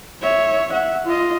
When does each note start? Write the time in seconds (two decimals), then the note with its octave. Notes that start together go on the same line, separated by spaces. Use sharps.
0.22 C#5 E5
0.72 E5 F#5
1.07 F4 D#5